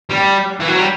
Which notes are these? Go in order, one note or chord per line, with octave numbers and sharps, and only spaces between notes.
G3
E3
F#3
G3